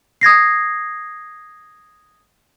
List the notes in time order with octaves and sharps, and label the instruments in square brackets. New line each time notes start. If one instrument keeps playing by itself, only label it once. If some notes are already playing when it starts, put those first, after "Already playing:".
[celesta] D#6 G#6 A#6 C7